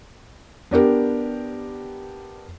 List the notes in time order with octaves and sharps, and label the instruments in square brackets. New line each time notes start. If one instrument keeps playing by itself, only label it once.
[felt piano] B3 D4 G4 A#4